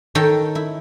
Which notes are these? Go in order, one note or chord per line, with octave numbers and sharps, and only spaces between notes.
D#3 A4 C#5 G5 A5
E4